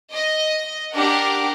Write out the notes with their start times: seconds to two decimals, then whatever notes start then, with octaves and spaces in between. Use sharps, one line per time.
0.14 D#5
0.93 D4 G4 A#4 F#5